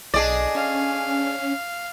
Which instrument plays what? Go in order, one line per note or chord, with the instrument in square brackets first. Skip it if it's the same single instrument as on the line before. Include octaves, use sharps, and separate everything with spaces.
[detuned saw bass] B1 [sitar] D4 G#4 D5 [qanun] D#5
[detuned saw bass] C#4 [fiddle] F5